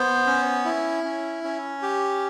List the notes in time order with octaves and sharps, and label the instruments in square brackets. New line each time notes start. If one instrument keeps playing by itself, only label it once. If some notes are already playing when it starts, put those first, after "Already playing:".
Already playing: [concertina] B3 C5
C#4
E4
C#4
C#4
G4